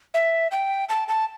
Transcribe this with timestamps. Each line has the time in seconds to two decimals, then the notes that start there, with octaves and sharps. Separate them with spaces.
0.14 E5
0.51 G5
0.89 A5
1.08 A5